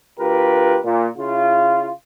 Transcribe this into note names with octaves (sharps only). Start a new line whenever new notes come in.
D2 F4 G4 A#4 B4
A#2
C#3 E4 F4